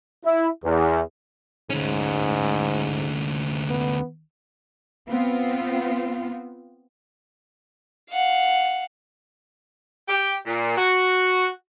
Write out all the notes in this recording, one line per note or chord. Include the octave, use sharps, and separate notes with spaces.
E4
E2
D2 G#2 C#4
B3
B3 C4 F4
F5 F#5
G4
A#2
F#4